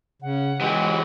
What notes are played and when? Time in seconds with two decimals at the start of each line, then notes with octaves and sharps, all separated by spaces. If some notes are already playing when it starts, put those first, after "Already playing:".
0.22 C#3 F#5
0.61 E3 F#3 G#3 G4